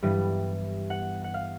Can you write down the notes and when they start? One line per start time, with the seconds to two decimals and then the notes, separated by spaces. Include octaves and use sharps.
0.02 G2 E3 G3 B3
0.90 F#5
1.24 F#5
1.34 F5